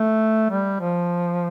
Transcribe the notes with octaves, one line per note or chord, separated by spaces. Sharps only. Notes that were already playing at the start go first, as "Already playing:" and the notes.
Already playing: A3
G3
F3